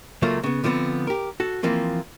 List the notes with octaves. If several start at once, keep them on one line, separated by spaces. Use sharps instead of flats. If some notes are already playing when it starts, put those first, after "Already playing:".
C#2 F#3 A3 A#3 F4
C#3 B3
D3 F3 G#3 B3 C4
G4 A#4
F#4 A4
E3 F3 A#3 C4